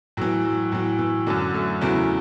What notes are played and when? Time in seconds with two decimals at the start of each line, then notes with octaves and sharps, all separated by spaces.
0.17 A2 E3 F#3
0.45 F#3
0.72 A2 E3 F#3
0.99 E3
1.26 F#2 D3 F#3
1.54 F#3 A3
1.81 E2 C#3 E3 F#3 A3